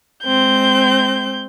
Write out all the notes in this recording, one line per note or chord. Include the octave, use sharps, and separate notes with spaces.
G#3 C4 G6